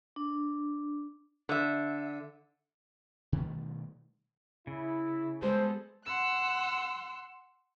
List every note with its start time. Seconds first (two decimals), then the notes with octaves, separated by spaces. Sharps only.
0.16 D4
1.49 D3 E5
3.32 B2 D#3 G3 A3
4.67 C#3 E4
5.42 G3 G#3 B3 A4 C5
6.04 F#5 C6 E6 F#6